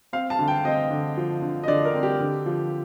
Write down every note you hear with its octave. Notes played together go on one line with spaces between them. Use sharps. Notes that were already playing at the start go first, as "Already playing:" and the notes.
C4 F5
A5
D3
G5
C4 D#5
D3
F3
D3
D#5
D3 D5
A#4
C4
G4
D3
F3